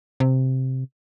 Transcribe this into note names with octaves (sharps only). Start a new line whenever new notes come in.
C3